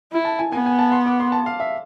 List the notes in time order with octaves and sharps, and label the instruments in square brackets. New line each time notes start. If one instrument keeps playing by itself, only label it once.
[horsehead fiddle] E4
[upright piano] A5
G#5
[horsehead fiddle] B3 [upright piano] G#5
[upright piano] G#5
A5
C6
D6
C6
A5
F5
E5